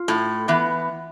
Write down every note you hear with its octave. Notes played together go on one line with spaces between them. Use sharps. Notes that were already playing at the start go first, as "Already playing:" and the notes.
Already playing: F4
A2
E3 B3